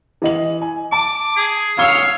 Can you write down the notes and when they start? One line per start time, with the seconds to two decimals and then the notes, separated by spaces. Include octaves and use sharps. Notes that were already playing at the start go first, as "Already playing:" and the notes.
0.22 E3 D#5 F#7
0.61 G#5
0.92 A5 D6
1.36 G#4
1.79 C#5 F5 D#6 E6 G7